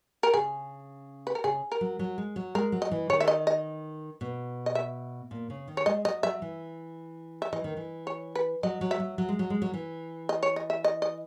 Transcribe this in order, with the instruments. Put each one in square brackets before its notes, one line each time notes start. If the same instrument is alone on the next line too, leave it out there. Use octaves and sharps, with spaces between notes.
[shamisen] A#4
[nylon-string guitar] C#3 [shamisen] G#4
[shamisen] B4
A#4
[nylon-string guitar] C#3 [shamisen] G#4
[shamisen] A#4
[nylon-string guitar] F#3
F#3
G#3
F#3
[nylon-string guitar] G#3 [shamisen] A#4
[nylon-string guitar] F#3
[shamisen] D#5
[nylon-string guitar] E3
[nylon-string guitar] D#3 [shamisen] C#5
[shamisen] E5
D#5
D#5
[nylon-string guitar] B2
[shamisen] D#5
E5
[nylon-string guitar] A#2
C#3
D#3
[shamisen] C#5
[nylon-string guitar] G#3 [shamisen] D#5
[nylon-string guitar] F#3 [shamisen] D#5
[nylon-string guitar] F#3 [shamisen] E5
[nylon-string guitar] E3
[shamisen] E5
[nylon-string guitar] E3 [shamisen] D#5
[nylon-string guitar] D#3
E3
[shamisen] C#5
B4
[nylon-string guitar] F#3 [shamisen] D#5
[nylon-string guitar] F#3
[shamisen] E5
[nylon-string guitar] F#3
F#3
G#3
F#3
G#3
F#3
E3
[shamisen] D#5
C#5
D#5
E5
D#5
D#5